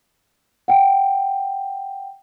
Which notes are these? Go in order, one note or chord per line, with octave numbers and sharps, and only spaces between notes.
F#5 G5